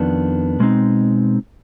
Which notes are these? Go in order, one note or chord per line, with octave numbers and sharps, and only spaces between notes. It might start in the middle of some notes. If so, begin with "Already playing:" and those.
Already playing: F2 D#3 B3 D4
B2 G#3 C4 D#4